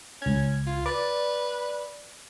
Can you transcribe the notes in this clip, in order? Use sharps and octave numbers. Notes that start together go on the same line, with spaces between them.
C#2 C#4 G#6
F4
B4 D5